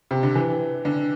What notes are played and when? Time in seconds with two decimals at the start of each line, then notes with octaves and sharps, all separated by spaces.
0.11 C3
0.23 D3
0.35 E3
0.85 D3